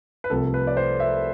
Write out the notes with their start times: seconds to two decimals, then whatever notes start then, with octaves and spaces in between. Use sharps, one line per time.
0.24 B4
0.30 C2 C3 F3 A3 A4
0.54 B4
0.67 D5
0.77 C5
1.00 E5